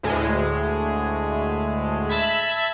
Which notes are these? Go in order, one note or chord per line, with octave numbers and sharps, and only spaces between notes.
D2 A2 G#3
E5 A5 B5 G#6 B6